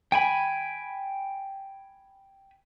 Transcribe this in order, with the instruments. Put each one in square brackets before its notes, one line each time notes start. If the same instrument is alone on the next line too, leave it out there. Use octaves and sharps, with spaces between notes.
[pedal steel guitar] G5 G#5 B5